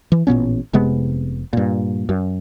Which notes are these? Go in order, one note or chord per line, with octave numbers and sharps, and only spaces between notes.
E3
A1 A#2 B3 C#4
F1 C3 G#3 B3
G2 A#2
F#2